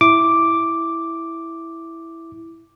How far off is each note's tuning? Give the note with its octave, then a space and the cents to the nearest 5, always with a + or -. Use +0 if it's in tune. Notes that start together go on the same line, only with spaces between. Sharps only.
E4 +0 D6 +0